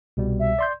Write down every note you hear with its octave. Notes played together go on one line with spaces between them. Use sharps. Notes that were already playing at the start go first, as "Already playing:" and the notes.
C2 B2 G3
E5
D5 C6 G6